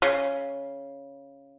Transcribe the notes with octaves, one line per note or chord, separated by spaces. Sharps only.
C#3